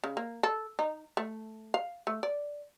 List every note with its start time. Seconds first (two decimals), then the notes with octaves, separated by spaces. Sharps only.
0.04 C#3
0.17 A#3
0.43 A4
0.79 D#4
1.17 A3
1.74 F5
2.07 A3
2.23 D5